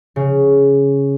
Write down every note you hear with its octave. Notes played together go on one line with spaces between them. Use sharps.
C#3